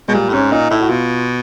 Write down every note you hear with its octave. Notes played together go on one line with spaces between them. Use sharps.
B2 G#3
A#2 G3
A2
G#2 C#4
A#2 D#4
A2 E4
F#4
B2 F4